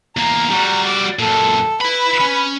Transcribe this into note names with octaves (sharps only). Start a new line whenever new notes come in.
E2 A#3 A#5
G3 F#4
D6
F#2 A#2 A4
E4 B4 B5
C#4